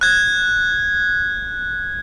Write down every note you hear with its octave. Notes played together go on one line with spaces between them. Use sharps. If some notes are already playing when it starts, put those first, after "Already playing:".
F#6 G#6